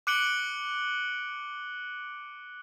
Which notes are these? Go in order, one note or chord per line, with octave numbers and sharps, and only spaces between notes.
D6 F#6 C#7 D7 F#7 G7